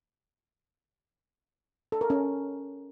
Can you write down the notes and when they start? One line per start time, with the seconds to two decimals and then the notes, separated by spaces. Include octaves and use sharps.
1.92 A4
2.01 A#4
2.10 C#4